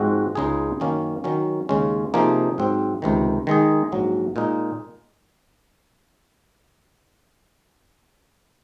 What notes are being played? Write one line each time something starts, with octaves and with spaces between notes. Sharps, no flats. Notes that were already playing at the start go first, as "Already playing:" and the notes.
Already playing: G#2 F3 G#3 C4 F#4
C#2 C#3 G#3 D#4 G#4
F#2 D#3 A#3 C#4
D#3 F#3 C#4
D#2 C#3 G#3 C#4
C3 F3 A#3 D#4 G#4
G#2 F#3 C4
C#2 C3 D#3
D#3 G#3 D#4 G#4
A#1 G#2 F#3
A#2 G#3 D#4